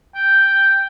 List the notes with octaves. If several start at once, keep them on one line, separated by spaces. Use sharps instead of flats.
G5